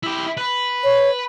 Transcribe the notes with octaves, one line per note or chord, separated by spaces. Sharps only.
E4 G4
B4
C#5